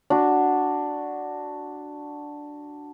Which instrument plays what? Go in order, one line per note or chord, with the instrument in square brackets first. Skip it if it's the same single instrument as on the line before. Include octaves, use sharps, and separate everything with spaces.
[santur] D4 F#4